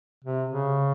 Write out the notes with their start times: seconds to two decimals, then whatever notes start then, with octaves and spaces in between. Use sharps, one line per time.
0.24 C3
0.49 C#3